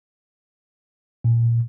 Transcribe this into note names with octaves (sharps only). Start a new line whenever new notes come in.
A#2